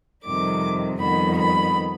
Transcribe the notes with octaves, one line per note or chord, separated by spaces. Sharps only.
F2 C3 D#3 G3 D6
F2 D#3 G3 B3 B5
B5